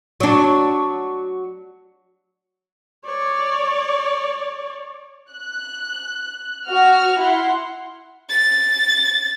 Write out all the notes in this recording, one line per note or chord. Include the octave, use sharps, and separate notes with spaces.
F#3 D4
C#5 D5
F#6
F#4 F6
E4 F#5 C6
A6